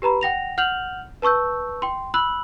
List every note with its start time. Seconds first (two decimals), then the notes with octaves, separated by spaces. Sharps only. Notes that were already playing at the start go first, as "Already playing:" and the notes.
0.02 G4 B4 A#5 B5
0.21 F#5 G5 A#6 F7
0.58 F#5 F6 G6 F7 F#7
1.22 B4 A5 C#6 E6 G6
1.82 G5 C6
2.14 B5 E6 F#6 F#7